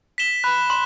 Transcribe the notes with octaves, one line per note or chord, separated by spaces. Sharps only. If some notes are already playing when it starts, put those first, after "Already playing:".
B6 E7 G7
B5 F#6
C6 E7